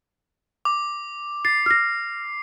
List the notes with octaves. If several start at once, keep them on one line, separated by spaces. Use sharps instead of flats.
D6
A6 C7
F6 A#6